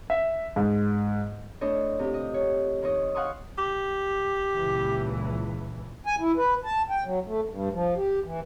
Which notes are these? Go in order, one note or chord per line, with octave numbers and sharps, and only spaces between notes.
E5
G#2
A2 D4 C5 C#5 D#5
C3 F3 G4
D#5
C#5
D#3 C5 C#5 D#5
F5 F#5 G#5 C6 C#6 D#6
G4
C#2 A#2 E3
G#5
E4
B4
A5
G5
F#3
A3
G2
F3
G4
E3